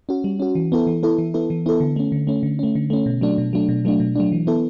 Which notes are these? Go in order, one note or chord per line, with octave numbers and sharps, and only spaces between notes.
C#4 F#4
G3
C#4 F#4
E3
B3 E4 A4
E3
B3 E4 A4
E3
B3 E4 A4
E3
B3 E4 A4
D3
A3 C#4
D3
A3 C#4
D3
A3 C#4
D3
A3 C#4
B2
F#3 A3 D4
B2
F#3 A3 D4
B2
F#3 A3 D4
B2
F#3 A3 D4
E3
B3 E4 A4